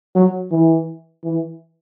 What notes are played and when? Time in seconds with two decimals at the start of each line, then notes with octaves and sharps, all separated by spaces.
0.15 F#3
0.51 E3
1.24 E3